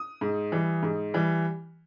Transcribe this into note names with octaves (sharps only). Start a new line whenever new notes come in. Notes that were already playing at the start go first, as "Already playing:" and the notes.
Already playing: D#6
G#2
E3 G3
G#2
E3 G3